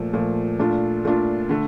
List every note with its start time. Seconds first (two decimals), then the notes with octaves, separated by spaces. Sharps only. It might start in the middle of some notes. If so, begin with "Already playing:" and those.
Already playing: A#2 F3 A3
0.13 A#2 F3 A3
0.59 A#2 A3 D4 F4
1.05 A#2 A3 D4 F4
1.49 D3 A3